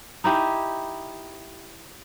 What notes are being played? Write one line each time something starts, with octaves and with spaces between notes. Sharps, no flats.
D#4 E4 G4